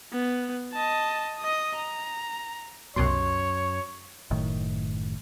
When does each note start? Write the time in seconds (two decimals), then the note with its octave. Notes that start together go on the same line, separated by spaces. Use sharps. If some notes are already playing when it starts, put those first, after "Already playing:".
0.12 B3
0.73 D#5 A5
1.38 D#5 D#6
1.75 A#5
2.96 C2 F#2 B2 C#5 C6
4.31 F#1 A2 D#3